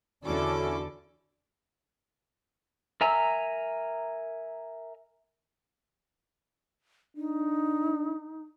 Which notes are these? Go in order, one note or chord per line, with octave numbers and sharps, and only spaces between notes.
E2 D3 C#4 D4 E4 F#4 A4 D6
A#4 E5 G#5 A#5 E6
D4 D#4